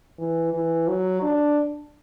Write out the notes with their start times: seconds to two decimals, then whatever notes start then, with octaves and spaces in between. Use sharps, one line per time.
0.19 E3
0.53 E3
0.88 F#3
1.23 D4